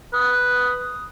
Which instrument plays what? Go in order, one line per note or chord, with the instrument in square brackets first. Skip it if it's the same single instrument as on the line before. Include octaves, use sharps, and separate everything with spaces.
[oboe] B4 [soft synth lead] D#6